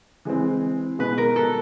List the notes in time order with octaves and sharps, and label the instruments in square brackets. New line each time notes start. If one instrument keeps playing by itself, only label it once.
[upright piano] E3 G#3 C4
[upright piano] B2 G#3 B3 [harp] B4
[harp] A#4
A4